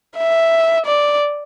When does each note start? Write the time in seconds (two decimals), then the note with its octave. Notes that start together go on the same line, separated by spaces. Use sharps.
0.17 E5
0.86 D5